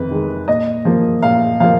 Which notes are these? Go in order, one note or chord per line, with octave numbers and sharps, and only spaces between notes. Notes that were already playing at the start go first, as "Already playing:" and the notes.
Already playing: F2 D#3 B4
D#3 G#3
A#2 D#5
F3 A#3
A#2 F5
F3 A#3 F5